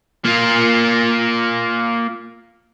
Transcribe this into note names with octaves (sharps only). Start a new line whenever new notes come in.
A#3 F4